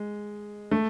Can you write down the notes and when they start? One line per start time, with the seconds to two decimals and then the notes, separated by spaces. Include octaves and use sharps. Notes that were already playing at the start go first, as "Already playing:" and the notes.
Already playing: G#3
0.71 A3